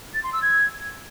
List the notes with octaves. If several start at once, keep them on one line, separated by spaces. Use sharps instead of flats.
A6
C6
E6
G#6